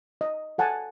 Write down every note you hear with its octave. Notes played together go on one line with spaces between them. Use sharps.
D#5
A4 F#5 G#5 A5